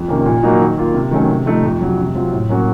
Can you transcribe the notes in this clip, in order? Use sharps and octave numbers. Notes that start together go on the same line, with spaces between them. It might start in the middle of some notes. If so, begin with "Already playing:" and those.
Already playing: F2
C3 D#3 A#3 C#4
A#2
F#3 A#3 D#4 F#4
D#3
A#3 F4
C3
D#3 F#3 A3 C#4
C3
F3 A3 D#4
F2
C3 F#3
C3
F#3 C4 F4
A2
F#3 A#3 C#4 F#4